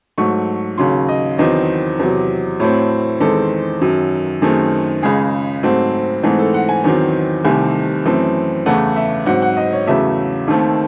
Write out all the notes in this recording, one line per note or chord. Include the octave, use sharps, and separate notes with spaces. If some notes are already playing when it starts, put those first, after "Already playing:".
G#2 F#3 A3 C#6
D#2 C#3 F#3 C6
D#5
E2 D#3 F#3 C4 D#5
E2 C3 F#3
A2 F#3 A3 C4 C#5
E2 D#3 G#3 C4 A4
F#2 D#3 F#3
F#2 D#3 A3 C4 G#4
C#2 C#3 G#3 G#4
G#2 F#3 A3 C4
G#2 E3 A3 C4 G#4
A4
F#5
G#5
E2 D#3 F#3 C4
C2 C3 D#3 A3 C4 G#5
F#2 E3 A3 C4
E2 C#3 E3 A3 F#5
E5
G#2 F#3 C4 F#5
F#5
D#5
C#5
E2 C#3 F#3 A3 E5
D#2 D#3 A3 C4